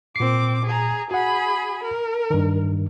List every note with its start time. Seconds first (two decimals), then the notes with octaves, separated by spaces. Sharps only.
0.16 A#2 C4 D6 C7
0.66 G#4 A#5
1.11 F#4 G#4 F#5 B5
1.84 A#4
2.30 G2 D#3